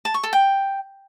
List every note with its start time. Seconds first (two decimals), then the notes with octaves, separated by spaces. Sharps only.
0.05 A5
0.14 C#6
0.23 A4
0.33 G5